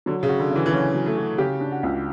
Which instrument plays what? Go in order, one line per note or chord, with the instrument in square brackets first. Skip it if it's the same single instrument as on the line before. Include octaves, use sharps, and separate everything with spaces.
[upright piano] D3 [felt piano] F#3
[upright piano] C#3
[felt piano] F#4
[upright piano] D3
[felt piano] C#3 [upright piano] E3
[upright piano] E3
[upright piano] F#3 [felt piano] C#4
[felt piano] F#3
[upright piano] A3
[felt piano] F#4
[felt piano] C#3 [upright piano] G4
[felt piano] D4
[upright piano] F#4
[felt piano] C#2